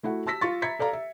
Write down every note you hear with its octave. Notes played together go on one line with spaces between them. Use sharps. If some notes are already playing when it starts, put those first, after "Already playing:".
A3 E4 F#4 F#5
A5 E6 A#6 B6
F4 C#6 A6
E5 A#5 B5 G#6 B6 C#7
A4 D5 F5 A#5
E5